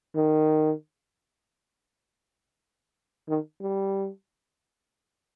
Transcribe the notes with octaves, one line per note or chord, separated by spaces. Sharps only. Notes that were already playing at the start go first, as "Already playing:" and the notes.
D#3
D#3
G3